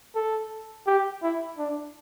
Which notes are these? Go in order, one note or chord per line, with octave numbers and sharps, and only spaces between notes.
A4
G4
E4
D4